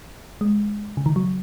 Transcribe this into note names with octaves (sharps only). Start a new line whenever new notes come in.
G#3
C#3
D#3
F#3